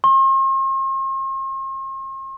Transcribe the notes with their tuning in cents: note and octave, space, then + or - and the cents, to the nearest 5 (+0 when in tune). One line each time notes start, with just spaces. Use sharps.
C6 +45